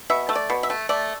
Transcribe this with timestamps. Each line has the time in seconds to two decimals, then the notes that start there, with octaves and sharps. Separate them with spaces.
0.10 B2 E5
0.29 A3
0.35 D5
0.50 B2
0.63 E5
0.70 A3
0.89 A3 D5